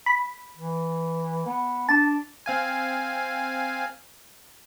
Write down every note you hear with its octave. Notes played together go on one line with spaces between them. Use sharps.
B5
E3
B3
D4 A5
C4 F5 G#5